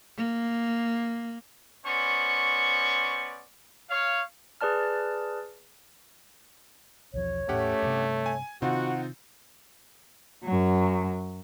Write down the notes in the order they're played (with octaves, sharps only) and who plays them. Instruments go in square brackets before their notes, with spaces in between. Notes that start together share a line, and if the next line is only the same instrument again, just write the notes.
[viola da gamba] A#3
[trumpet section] B3 C#4 C5 D5 C#6
C#5 F5
[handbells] G#4 B4 D5 A5 F6
[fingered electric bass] B1 E2 F3 [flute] C#5
[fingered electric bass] E2 A2 [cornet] A3 [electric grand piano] C#4 G4 F#5
[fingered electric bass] G2 C3
[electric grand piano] G#5
[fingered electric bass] C3 D#3 [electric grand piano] C4 D#4 F4 [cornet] F#4 [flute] F#5
[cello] F#2 F#3